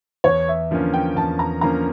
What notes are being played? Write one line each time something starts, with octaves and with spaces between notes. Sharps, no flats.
E2 C#5
E5
D3 F3 A#3 C#4
G5
E2 A5
A#5
D3 F3 A#3 C#4 A#5